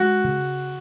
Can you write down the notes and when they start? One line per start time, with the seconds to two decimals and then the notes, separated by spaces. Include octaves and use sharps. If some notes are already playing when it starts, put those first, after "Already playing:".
Already playing: G#3 F#4
0.24 C#3